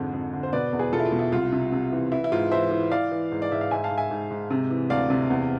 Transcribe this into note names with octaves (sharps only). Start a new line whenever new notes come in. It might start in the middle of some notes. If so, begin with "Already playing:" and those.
Already playing: F2 G#2 D3
F2
D3
C5
B2 B4 D5
E2
G#4 B4
B2 F4 A4
E4
F4
B2
E4
C2 F4
C3
C3
E3
E3 E4
E4
G#2 F4
E3 C5 E5
E3
E3 D5 F5
E3
G#2
D5
G#2 E5
F5
G#2 E5 G#5
F5 A5
G#2
E5 G#5
G#2
G#2
C3
E3
D2 D5 F5
C3
E2